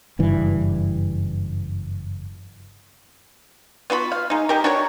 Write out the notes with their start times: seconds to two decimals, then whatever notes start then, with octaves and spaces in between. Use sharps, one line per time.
0.19 F#1 G2 E3
3.90 B3 F4 F#4 B5
4.12 F5
4.30 G#3 D#4
4.49 D#4 G4 A#4
4.64 D4 F#4 A#4 C#5